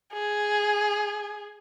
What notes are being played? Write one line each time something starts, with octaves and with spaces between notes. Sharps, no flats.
G#4